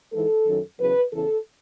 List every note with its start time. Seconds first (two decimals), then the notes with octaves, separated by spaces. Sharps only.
0.13 G#2 E3 A4
0.47 F#2 D#3 F#3
0.80 E2 C#3 F#3 B4
1.13 E2 C#3 E3 A4